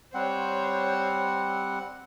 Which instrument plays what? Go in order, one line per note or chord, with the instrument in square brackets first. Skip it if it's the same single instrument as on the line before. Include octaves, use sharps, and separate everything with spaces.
[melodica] G3 C4 F#5 [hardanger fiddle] C5 C#5